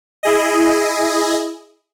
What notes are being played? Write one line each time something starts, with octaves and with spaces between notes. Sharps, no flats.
E4 G#4 D#5